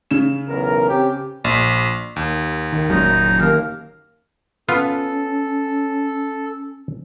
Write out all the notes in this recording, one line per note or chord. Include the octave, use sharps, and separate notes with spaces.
C#3 E7
B1 E2 A#4
C4 C#4 G4
A#1
D#2
D#3
F#1 F#2 A#2 F#3 D#4
D#2 A#3 F5
B3 C#4 F4 A4